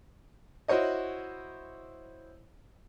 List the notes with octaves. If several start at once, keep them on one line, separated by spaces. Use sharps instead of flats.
E4 F#4 C5 C#5 D#5